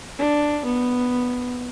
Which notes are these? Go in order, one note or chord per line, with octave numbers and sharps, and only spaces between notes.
D4
B3